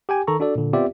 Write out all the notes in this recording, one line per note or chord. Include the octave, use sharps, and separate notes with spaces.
G4 G5 G#5
D#3 A4 A#5 C#6
D4 F#4 A4 D5
A#2 D3
B3 C4 F4 G4 D5 E5